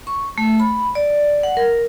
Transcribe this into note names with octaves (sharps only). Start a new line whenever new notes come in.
C#6
A3
B5
D5
F#5
A#4